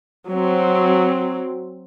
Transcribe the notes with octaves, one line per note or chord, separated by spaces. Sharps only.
F#3 C4